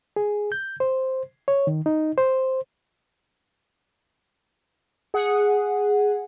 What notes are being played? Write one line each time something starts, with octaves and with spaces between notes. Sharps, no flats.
G#4
G6
C5
C#5
D#3
D#4
C5
G#4 F#5